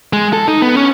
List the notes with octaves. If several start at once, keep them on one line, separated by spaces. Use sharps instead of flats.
G#3
A4
D#4
B3
C#4